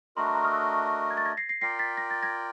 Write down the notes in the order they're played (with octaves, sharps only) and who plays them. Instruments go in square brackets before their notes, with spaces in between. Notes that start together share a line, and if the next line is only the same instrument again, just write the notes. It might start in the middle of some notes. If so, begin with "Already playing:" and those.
[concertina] A3 D4 F#4 A#4 D#5 [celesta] A#5 C6
[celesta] B5 C#6
A#5 C6
D#6 F6
E6 F#6
G#6
A6
G#6 A#6
A#6 C7
A#6 C7
[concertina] F4 A#4 D5 G5 [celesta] A#6 C7
[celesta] A6 B6
A#6
A6
G#6 A#6